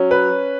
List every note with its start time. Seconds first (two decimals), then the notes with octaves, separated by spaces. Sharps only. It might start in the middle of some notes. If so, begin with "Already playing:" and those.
Already playing: F#3 C#4
0.11 B4